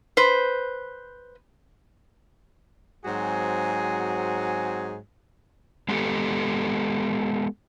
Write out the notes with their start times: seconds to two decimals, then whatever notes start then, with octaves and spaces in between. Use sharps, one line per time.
0.17 B4 C5
3.05 G#2 F#3 C4 F#4 G#4
5.89 G#3 B3 D#4 F#4 G4 A4